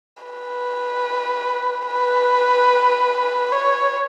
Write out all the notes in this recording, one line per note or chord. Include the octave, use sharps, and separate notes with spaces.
B4
B4
C#5